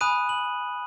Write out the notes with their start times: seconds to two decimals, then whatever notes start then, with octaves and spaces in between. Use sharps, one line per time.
0.01 G#5 B5 D#6 F#6 D#7
0.29 F#7